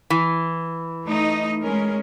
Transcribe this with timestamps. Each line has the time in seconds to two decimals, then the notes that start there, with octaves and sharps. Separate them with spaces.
0.10 E3
1.06 A3 D#4 D#5
1.63 G#3 C#4 A#4